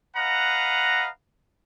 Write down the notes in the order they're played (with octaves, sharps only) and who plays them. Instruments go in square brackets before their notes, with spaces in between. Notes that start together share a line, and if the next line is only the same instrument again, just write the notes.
[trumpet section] B4 D#5 F5 F#5 A#5